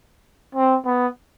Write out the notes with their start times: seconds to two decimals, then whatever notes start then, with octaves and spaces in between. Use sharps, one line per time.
0.55 C4
0.86 B3